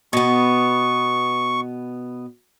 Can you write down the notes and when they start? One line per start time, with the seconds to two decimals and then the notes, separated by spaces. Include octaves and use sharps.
0.13 B2 B3 C#6